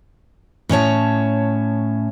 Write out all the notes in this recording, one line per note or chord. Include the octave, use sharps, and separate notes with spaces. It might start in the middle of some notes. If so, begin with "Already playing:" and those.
A2 C#4 C#5 A5